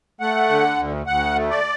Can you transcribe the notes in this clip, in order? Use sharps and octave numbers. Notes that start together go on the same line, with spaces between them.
A3 F#5
D3
D2
D2 F#5
A3
D5